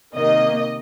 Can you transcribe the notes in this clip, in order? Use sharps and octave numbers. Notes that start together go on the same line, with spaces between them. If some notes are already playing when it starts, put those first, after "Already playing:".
C3 D#3 A#3 D#5